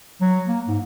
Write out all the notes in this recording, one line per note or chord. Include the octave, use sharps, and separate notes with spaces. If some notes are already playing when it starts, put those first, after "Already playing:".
F#3
A#3
G#2